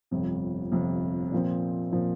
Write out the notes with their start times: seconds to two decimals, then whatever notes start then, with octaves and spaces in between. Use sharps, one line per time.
0.11 G1 F2 C3
0.72 G1 F2 C3
1.32 A#2 F3 C4
1.92 A#2 F3 C4